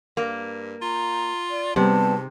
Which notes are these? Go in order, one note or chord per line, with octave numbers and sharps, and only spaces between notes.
G2 A#3
F4 A#5
D5
G#2 C3 G3 B3 C4 A5